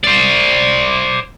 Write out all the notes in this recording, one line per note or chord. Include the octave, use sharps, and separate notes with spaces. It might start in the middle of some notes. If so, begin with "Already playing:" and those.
C5 D5